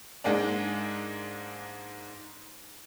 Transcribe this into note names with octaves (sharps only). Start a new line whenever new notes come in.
G#2 G#3 A#3 D4